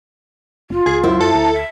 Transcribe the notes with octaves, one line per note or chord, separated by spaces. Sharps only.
F#1 F4
C#2 G#4
F#2 E4 C5 E5
F#2 A4
D2 A#5
E5